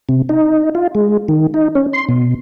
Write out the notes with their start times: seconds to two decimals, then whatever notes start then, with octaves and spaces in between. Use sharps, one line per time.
0.09 C3
0.29 D#4
0.75 F4
0.95 G#3
1.28 D#3
1.54 D#4
1.75 C#4
1.93 C6
2.09 B2